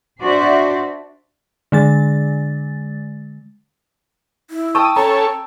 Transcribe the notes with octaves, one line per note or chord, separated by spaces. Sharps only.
D4 F#4 C5 D5 E5
D3 G#3 A6
E4
G5 A5 C#6 D#6 E6
C#4 A4 C#5 A#5